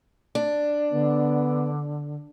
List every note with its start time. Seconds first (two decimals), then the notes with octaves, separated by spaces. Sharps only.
0.35 D4
0.92 D3 B3